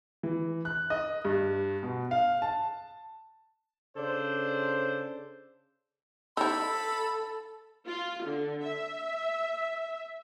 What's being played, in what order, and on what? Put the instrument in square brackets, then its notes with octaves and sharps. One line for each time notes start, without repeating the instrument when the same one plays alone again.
[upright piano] E3
F#6
D#5
G2
B2
F5
A5
[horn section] C#3 D4 A4 C5
[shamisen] D#4 E4 [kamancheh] A4 [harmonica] B5 [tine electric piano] E6
[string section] F4
D3
E5